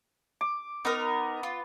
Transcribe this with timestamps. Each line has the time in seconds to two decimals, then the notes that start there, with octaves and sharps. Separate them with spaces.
0.41 D6
0.85 B3 D#4 A#4
1.43 F4